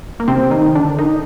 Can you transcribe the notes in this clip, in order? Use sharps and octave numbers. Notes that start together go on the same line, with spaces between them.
A#3
C3 C4
D#3 D#4
D3 D4
D#3 D#4